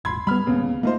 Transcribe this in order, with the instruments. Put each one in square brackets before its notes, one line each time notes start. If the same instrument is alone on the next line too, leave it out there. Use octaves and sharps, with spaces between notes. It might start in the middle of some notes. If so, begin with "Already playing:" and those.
[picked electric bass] D#1 G#1 [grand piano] B5 C6 G#6
[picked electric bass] G3 B3 [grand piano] B5 F6
[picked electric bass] D1 B3 [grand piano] D#2 C#3
[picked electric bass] A3 A#3 [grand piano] D#4 F4 C5